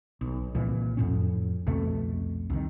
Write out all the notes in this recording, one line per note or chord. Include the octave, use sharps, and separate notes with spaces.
B1
C2 A#2 E3
F2 A2 C#4
C2 F2 B2 A3
C2 D#3